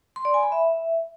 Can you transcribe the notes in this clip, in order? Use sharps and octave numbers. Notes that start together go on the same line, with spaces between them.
C6
D5
G#5
B5
E5